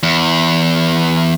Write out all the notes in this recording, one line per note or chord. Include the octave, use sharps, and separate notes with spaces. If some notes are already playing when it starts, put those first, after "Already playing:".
E2